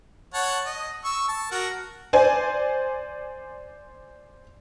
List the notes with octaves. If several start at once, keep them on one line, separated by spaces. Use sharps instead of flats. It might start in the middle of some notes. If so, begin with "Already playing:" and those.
C#5 F#5 A5
D#5
C#6 E6
A5
F#4 A#4
C5 D5 G#5